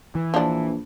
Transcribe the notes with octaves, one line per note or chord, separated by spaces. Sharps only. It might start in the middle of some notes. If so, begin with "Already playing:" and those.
E3
A#1 F3 D4